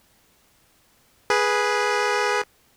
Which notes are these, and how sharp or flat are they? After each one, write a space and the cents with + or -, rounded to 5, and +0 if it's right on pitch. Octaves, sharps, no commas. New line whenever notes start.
G#4 +0 B4 -10